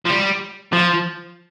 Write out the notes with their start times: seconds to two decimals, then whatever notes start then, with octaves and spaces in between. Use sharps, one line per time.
0.05 F3
0.09 G3
0.73 F3